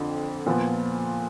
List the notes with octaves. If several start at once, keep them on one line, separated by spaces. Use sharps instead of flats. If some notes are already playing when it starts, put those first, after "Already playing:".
Already playing: F2 D3
A#2 F3 B3